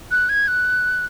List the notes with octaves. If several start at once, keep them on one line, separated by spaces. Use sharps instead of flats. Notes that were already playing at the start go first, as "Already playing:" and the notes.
F#6
G#6
F#6